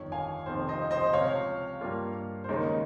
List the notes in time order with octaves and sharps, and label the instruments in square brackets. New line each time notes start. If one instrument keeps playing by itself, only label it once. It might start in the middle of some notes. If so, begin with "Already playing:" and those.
Already playing: [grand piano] G1 F2 D#3 [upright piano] C#5
[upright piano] F5 G#5
[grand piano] F1 F2 C3 D#3 [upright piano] C5
[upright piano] C5 D#5
C5 D#5
[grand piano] C#2 C3 F3 [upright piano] C#5 F5
[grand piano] G2 G3 A#3 F4
[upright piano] C5
[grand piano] D#2 C#3 G#3 D#4 [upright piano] A#4 C#5